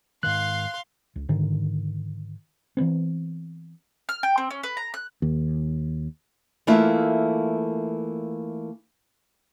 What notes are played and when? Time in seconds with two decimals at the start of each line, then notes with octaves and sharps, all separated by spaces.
0.23 G#2 D#3 F5 C6 F#6
1.16 C#2
1.29 G#2 D3 D#3
2.77 E3 F3 B3 C4
4.09 F6
4.23 G5
4.38 C4
4.51 C#4
4.63 B4
4.77 A#5
4.94 F#6
5.22 D#2
6.67 E3 A3 A#3 E4 F4 E5